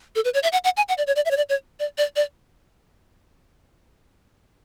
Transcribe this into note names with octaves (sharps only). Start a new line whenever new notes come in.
A4
B4
C#5
E5
F#5
F#5
G#5
F#5
D5
C#5
D5
E5
C#5
D5
C#5
D5
D5
D5